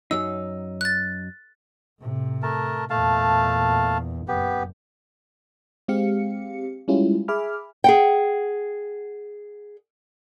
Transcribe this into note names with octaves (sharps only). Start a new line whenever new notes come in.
F#2 F#3 D#4 E6
F#6 A6
A2 C3
A3 A#4 A5
E2 A#2 A3 F5 A5
F#1 B3 G4
G#3 C4 G4 F5 C#7
G3 G#3 C#4 E4 F4 G4
G#4 E5 G#5 B5 D6 F6
G#4 F#5 G5